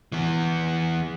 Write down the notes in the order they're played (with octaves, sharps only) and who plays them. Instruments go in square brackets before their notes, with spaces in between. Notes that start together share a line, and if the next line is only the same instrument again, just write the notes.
[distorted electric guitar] E3 B3